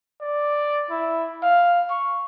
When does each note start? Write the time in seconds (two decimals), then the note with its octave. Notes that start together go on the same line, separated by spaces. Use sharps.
0.21 D5
0.91 E4
1.42 F5
1.90 C#6